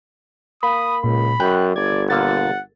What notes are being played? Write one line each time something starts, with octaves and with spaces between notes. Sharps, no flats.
A#3 B5 D#6
C#2 A#2 B5
F#2 G5 F#6
G1 D5 G#6
A#2 D3 A#3 F#5 A6